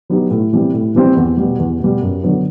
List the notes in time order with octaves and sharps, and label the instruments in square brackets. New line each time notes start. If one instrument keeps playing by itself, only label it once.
[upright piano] F#3 B3 D#4 G4
A2
E3 G3 C4
A2
E3 G3 C4
E2
B2 G3
E2
B2 G3
F#2
D3 F#3 B3 D4